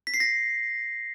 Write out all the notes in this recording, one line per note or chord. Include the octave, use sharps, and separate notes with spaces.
B6
C7
A#6